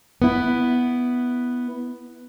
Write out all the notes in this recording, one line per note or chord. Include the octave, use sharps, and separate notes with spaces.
B3 E4